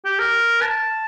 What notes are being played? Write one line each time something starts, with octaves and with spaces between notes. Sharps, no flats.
G4
A#4
A5